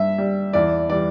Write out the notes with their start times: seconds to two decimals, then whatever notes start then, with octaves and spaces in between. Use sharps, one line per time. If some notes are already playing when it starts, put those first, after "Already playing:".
Already playing: G2 E5
0.18 G3
0.53 E2 D5
0.90 E3 G3 D5